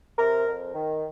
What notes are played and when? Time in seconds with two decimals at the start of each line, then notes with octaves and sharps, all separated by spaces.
0.19 C3 A#4
0.47 F2
0.75 D#3